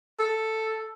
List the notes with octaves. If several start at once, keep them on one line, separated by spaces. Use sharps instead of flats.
A4